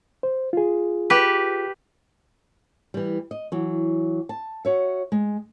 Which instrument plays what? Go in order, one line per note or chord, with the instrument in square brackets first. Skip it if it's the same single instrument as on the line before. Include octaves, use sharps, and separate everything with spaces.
[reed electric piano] C5
F4 G#4
[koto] G4 B4
[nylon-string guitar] E3 G3
D#5
E3 F#3
A5
F#4 C#5 E5
G#3